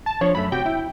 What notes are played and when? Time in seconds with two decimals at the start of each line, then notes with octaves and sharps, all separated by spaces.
0.06 A5
0.21 F3 D4 C5 C#5
0.35 F#2 A3 B5
0.52 C3 F#4 G4 G5
0.65 E4